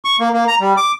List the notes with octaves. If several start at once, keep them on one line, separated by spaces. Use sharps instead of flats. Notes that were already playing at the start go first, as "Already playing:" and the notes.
C#6
A#3
A#3
A#5
G3
D6